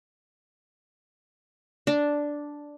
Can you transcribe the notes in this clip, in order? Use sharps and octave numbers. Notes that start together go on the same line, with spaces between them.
D4